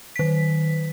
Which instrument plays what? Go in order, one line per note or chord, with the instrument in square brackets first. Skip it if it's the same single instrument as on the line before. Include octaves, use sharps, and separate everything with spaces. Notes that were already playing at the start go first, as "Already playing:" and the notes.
[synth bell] D#3 B6